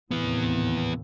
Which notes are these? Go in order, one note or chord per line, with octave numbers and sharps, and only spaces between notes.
D#2 A2 C3 E3 B3